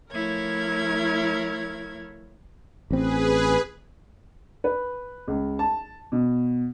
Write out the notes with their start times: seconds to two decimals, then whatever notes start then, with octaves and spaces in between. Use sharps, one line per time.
0.12 F3 A3 E4 A#4 C#5 G#6
2.91 A1 C4 G#4 B4
4.64 B4
5.28 C#2
5.59 A5
6.12 B2